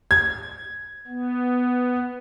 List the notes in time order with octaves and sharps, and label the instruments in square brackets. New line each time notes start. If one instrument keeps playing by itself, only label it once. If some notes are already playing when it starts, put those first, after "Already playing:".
[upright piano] G#6
[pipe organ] B3